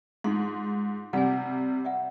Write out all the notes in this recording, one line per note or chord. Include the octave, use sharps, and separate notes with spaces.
G#2 D#4 F4 C6
C3 G3 F#5 G#5
D5 E5 F#5